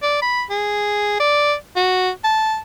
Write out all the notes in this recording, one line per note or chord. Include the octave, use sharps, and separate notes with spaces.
D5
B5
G#4
D5
F#4
A5